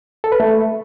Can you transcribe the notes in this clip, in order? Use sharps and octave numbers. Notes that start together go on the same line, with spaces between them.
A4
B4
A3